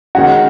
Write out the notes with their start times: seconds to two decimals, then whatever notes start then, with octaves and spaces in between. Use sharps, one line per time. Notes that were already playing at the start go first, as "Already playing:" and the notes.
0.15 D#3 G#3 C#4 F#4 F#5